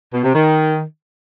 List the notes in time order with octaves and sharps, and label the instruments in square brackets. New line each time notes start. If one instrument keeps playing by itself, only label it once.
[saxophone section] B2
C3
D#3